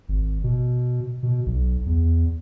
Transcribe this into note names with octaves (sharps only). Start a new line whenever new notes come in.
G#1
B2
B2
B1
E2